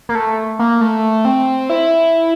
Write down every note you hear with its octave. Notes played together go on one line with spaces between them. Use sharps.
A#3
A3
A#3
A3
C4
E4